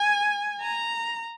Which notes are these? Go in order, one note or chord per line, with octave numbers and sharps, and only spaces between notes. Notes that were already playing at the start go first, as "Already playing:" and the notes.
Already playing: G#5
A#5